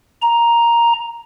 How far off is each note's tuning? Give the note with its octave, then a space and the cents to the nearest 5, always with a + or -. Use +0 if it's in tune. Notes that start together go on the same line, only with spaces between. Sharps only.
A#5 +5